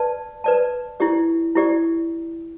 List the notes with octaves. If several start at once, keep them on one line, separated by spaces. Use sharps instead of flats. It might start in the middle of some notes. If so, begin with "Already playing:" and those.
Already playing: B4 D5 A5
B4 D5 A5
E4 G4 D5
E4 G4 D5